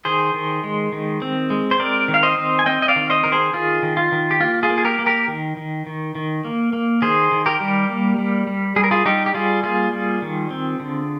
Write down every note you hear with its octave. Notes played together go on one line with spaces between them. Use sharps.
D#3 G#4 C5
D#3
G#3
D#3
C4
G#3
C5
C4 A#4 D5
D#3
F5
C5 D#5
C4
G#5
C4 D#5 G5
D#5
D5 F5
D#3
C5 D#5
D#3 A#4
G#4 C5
D#3 F4 G#4
D#3
F4
D#3
G4
A#3 F4
F4 G#4
A#3
G#4
G4 A#4
A#3
G4 A#4
D#3
D#3
D#3
D#3
A#3
A#3
D#3 G#4 C5
D#3
G4 A#4
G3
A#3
G3
G3
G3 G#4
A#4
F4 G#4
G3 D#4 G4
G4
G3 F4 G#4
A#3 F4 G#4
G3
D#3
C4
D3